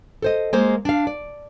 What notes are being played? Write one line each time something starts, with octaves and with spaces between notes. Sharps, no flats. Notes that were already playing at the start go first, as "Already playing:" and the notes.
A4 C5 D#5
G#3 A#3 C5
D4 F5
D5